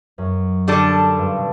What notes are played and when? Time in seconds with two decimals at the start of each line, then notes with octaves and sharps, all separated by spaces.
0.18 F#2
0.68 D3 G3 D4 A4
1.18 G2
1.36 B2